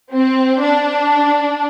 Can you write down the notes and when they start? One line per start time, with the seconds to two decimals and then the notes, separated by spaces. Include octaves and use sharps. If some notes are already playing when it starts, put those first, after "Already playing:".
0.12 C4
0.62 D4